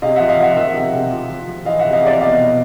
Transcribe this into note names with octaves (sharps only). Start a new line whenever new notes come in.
C3 D#5 F5
F3 E5 F#5
D#5 F5
F3 E5 F#5
D#3 E5 F#5
C3
C3
F3
F3
F3
E3 D#5 F5
E5 F#5
C3
D#5 F5
C3 D5 E5
B2 D#5 F5
B2